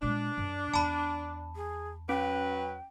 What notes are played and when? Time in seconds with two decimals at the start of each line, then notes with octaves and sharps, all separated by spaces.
0.02 A#2 G#3 D4
0.37 F#2
0.74 E2 A5 B5
1.56 G#4
2.09 F#3 C#4 B4 G5